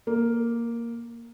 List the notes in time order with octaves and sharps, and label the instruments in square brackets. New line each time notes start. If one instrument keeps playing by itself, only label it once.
[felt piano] A#3